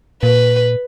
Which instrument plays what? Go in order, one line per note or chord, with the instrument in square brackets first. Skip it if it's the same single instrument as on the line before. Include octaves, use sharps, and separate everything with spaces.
[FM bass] A#2 [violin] B4